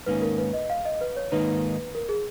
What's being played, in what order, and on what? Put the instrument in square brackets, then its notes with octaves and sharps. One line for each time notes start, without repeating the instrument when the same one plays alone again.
[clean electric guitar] G#2 D#3 A#3 C#4 [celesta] B4
[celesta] A#4
B4
D#5
F5
D#5
B4
C#5
[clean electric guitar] G#2 D#3 A#3 D#4 [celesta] B4
[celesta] A#4
G#4